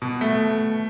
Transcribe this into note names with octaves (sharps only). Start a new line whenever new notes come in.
B2
A3